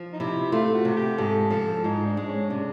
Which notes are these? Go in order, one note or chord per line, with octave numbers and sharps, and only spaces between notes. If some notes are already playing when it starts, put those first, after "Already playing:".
Already playing: F3
D#4
C3 E4
A3 F4
F#4
C3
G4
G#2 A4
F3 A4
G#2 D#4
D4
G#3
C#4
C3 D4